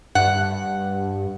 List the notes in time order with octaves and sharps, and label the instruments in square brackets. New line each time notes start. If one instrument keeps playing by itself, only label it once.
[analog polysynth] G2 [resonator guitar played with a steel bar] F#5